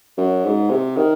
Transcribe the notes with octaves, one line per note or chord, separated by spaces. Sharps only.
F#2
G#2
C3
D#3